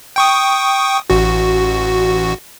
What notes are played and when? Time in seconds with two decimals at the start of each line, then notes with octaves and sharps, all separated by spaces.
0.16 G5 C#6 D#6
1.10 A1 F#4